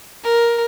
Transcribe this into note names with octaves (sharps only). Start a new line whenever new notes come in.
A#4